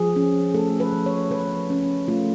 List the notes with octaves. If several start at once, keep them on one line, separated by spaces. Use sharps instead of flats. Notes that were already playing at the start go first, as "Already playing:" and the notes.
Already playing: F3 G#4
C#4
A3 A4
B4
F3
C#5
F3 B4
C#4
A3 F4